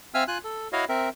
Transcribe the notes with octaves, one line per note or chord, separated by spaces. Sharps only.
C4 E5 F5 G#5 E6 F6
F4 G#5 F#6
A4
E4 F#4 C#5 D#5 F5
C4 A#4 E5